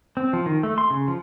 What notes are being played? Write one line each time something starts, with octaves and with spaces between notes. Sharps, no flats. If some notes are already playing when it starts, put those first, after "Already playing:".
C4
F3
D#3
A3
C6
C#3
F3